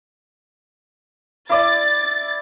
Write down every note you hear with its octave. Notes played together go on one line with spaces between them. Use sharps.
E4 D5 A6